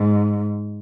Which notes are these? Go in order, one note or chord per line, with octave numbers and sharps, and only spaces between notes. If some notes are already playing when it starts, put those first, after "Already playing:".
Already playing: G#2